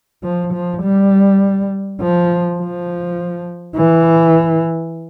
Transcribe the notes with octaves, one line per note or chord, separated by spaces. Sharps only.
F3
F3
G3
F3
F3
E3